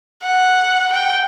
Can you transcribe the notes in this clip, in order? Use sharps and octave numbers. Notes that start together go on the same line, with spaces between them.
F#5
G5